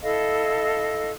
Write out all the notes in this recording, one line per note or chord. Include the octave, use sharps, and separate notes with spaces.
E4 A4 D#5 F5